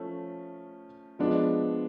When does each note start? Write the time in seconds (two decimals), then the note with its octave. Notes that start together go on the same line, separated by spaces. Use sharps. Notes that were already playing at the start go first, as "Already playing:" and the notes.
Already playing: F3 A3 C#4
1.19 F3 G#3 B3 D4